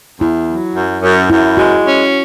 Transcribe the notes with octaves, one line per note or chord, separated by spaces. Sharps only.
E2 E4
F#3
F#2
F#2
F#2 E4
G#3 F#4
C#4